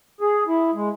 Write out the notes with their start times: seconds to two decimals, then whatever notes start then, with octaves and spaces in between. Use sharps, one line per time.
0.21 G#4
0.47 E4
0.74 G#3